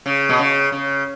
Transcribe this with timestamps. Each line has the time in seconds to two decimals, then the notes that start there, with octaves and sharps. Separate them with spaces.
0.06 C#3
0.29 B2
0.39 C#3
0.72 C#3